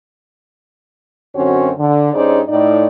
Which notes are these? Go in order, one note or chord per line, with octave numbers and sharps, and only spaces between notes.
F#2 D3 C4 C#4 F#4 C#5
D3
G2 C#4 D#4 G#4 C5 D5
A2 D#4 D5